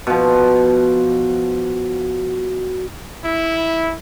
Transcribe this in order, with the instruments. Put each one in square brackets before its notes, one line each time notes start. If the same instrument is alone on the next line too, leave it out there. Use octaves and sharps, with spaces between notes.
[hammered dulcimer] B2 F3
[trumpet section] E4